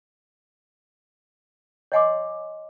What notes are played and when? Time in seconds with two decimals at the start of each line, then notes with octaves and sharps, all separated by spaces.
1.92 C#5 D#5 F#5 G#5 C6 D6